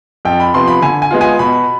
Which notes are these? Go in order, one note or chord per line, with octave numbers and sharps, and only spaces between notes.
F2 G5
B5
C3 F3 B3 F4 C6
B5
D3 G#5
G#5
G#3 B3 F4
G#5
B2 B5